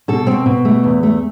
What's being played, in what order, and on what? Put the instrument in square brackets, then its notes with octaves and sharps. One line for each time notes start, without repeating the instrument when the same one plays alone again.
[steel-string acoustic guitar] B2 A4
B2 C4
B2
A3
E2
A3